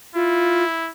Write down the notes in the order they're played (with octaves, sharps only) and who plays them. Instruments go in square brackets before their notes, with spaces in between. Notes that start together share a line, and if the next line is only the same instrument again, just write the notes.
[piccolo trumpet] E4 [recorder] F4